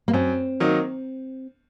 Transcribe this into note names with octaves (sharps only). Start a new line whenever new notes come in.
A#3
F#2 C4
D#3 F#3 A#3 D#4